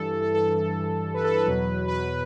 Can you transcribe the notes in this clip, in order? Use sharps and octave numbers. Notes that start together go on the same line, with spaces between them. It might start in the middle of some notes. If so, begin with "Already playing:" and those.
Already playing: G2 E3 A4
A4
A4
A4
B4
A4
B4
E2 B2 F#3
B4